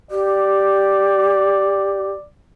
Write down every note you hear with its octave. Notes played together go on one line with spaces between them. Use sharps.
G4 D5